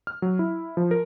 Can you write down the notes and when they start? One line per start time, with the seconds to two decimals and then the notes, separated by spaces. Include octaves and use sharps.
0.07 F6
0.22 F#3
0.39 E4
0.77 F3
0.91 A#4